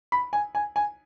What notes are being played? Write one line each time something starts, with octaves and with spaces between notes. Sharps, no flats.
B5
G#5
G#5
G#5